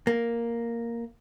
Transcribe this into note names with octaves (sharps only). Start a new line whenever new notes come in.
A#3